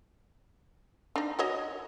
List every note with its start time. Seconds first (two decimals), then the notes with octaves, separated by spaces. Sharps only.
1.16 D4 D#4
1.39 F#4 C#5 D#5